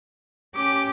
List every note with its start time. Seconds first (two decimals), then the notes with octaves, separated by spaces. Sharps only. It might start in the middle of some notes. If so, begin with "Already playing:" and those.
0.55 C#4 G4 D6